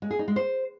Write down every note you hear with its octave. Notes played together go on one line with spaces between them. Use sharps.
G#3
G#4
D#4
G#3
C5